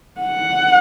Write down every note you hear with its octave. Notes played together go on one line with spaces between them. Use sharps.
F#5